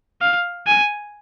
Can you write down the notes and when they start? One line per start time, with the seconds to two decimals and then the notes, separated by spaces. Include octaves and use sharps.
0.21 F5
0.67 G#5